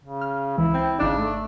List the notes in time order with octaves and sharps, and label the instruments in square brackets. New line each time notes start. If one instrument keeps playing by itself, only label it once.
[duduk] C#3
[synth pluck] F6
[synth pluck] C#2 E3 [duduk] E4
[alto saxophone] C4
[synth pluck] G#1 D#4 D5 [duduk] C#3 [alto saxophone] D4
[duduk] A3